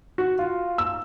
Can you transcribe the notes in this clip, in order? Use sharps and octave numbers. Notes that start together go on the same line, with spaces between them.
F#4
F4
E6